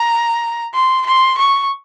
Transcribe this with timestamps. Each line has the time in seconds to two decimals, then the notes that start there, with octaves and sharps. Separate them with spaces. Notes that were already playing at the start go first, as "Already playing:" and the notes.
Already playing: A#5
0.74 C6
1.06 C6
1.38 C#6